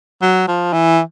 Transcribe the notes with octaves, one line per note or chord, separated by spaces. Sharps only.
F#3
F3
E3